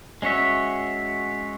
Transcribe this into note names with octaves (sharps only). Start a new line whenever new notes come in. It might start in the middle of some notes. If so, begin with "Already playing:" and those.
G#3 C#4 F#4 C#5 E5